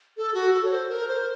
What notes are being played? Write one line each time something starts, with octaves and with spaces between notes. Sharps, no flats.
A4
F#4
A4
C#5
C5
A#4
C5